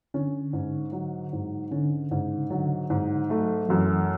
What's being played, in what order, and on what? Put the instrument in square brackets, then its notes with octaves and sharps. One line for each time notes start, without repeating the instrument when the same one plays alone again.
[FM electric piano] D3 [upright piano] C#4
[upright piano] G#2
F#3
G#2
[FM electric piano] D3 [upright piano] C#4
[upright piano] G#2 [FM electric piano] C#3
[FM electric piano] D3 [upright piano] F#3
[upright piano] G#2
[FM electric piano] F#3 [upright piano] A3
[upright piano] F#2 [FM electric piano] E3